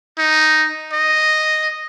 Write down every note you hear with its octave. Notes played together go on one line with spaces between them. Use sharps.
D#4
D#5